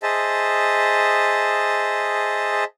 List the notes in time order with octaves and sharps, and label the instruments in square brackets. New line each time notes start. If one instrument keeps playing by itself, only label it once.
[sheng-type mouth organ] G#4 C5 D#5 E5 A5